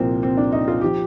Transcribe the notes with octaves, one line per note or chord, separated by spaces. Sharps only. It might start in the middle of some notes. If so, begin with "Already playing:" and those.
Already playing: C2 A#2 F3 A#3 C4
C4
D4
D#4
F4
F3 G4